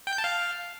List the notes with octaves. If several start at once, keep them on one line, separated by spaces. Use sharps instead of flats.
G5
G6
A5
F5